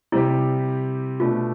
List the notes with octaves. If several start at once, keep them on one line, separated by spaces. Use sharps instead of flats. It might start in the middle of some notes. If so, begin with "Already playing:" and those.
C3 G3 C4 E4 G4
B2 A3 D4 F4